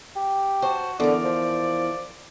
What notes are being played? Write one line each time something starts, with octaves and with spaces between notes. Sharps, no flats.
G4
F#4 C5 A5
E2 D3 A#4 D5
F3